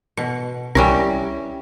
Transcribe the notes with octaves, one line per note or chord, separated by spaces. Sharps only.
B2 C#7
C2 G3 C#4 E4 A#4